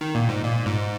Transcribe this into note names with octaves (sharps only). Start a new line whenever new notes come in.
D#3
A#2
G#2
A#2
G#2